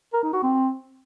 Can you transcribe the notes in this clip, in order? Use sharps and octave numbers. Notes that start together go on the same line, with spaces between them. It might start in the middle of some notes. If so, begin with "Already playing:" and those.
A#4
D#4
F#4
C4